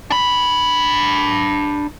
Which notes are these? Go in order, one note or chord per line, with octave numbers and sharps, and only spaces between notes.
D4 B5